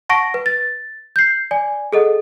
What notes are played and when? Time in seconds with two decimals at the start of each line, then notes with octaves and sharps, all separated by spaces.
0.09 F#5 A5 C#6 A#6 D7
0.34 B4
0.46 A6
1.16 G6 C7
1.51 D5 G#5
1.93 G#4 A4 D#5 F#5